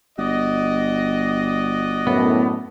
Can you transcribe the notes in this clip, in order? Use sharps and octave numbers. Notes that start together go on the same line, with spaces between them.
G1 F#4 D5 D#5
F#2 A2 B3